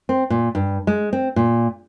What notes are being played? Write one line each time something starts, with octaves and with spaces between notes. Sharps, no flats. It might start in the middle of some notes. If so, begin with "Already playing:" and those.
C4
A#2
G2
G#3
C4
A#2